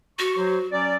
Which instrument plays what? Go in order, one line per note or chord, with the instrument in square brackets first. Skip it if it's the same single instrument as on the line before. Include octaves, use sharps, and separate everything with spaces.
[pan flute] F#4 [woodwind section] C#6
[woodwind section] F#3 C5
F#3 C#4 D5